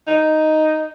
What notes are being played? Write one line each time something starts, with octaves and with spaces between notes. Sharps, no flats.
D#4